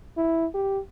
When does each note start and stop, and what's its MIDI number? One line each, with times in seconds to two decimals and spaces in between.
0.17 0.47 64
0.54 0.79 67